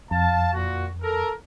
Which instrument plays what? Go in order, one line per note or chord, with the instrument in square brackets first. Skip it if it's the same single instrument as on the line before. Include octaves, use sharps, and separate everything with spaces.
[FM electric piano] F2 [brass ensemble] F5 A5
[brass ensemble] A#2 F#4
A4 A#4